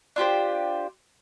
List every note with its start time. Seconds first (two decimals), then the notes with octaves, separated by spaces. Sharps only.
0.16 D4 F4 G4 C5